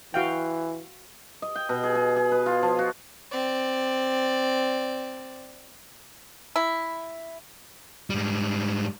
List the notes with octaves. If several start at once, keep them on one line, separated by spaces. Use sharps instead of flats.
E3 F#4 F5 G5
D#5
G5
B2
G#4
G#4
G#4
B4
F4
F3
F#4
C4 D5
E4
G#2 G3